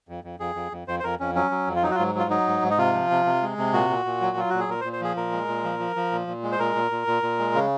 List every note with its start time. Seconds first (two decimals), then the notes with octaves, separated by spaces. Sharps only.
0.09 F2
0.24 F2
0.40 F2 G#4
0.55 F2
0.72 F2
0.88 F2 C5
1.00 C5
1.04 F2 A#4
1.20 F2 C#4
1.35 F#3 C#4
1.51 F#3
1.67 F2
1.76 F4
1.83 F#3 D#4
1.91 F#4
1.95 F4
1.99 G#2
2.15 F#3 F4
2.30 F#3 D#4
2.47 G#2
2.62 G#2
2.70 D#4
2.78 C3 F4
2.94 F3
3.10 C3
3.26 C3
3.42 G#3
3.58 C3
3.73 A#2 F#4
3.90 A#2
4.05 A#2
4.21 F#3
4.37 F#3 F4
4.50 A#2 F#4
4.60 G#4
4.68 A#2 A#4
4.81 C5
4.84 A#2
4.93 C5
5.01 F3 G#4
5.16 A#2 A#4
5.32 G#3
5.48 A#2
5.64 F3
5.79 F3
5.96 F3
6.12 A#2
6.27 A#2
6.43 G#3
6.52 C5
6.59 A#2 A#4
6.75 A#2
6.91 A#2
7.07 A#2
7.23 A#2
7.39 G#3
7.55 C#3